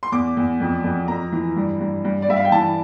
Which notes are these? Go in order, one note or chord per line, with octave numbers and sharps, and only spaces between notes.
C6
E2 D6
E2
F2
F2
F2 A#5
E3
G2
G2
G2
D5
G2 E5
F5
G5
E3 A5